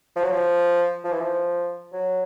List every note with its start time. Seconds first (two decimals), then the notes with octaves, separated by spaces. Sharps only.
0.16 F3
0.24 F#3
0.32 F3
1.05 F3
1.12 E3
1.20 F3
1.93 F#3